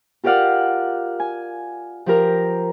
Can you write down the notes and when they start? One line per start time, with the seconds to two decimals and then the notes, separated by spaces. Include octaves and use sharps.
0.24 F4 G4 A#4 D5 F5 F#5
1.20 G#5
2.06 F3 G4 A#4 A#5